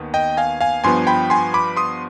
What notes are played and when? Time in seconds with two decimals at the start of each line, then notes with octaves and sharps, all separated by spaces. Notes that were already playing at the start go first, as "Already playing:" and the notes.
Already playing: D#2 D#3 B3
0.14 D#5 G5
0.37 F5 G#5
0.61 F5 G#5
0.84 G2 F3 B3 G#5 C6
1.07 G5 B5
1.30 G#5 C6
1.54 B5 D6
1.77 C6 D#6